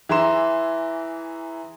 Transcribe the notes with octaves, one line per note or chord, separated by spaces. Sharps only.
E3 G#4 E5 A#5 C6 E7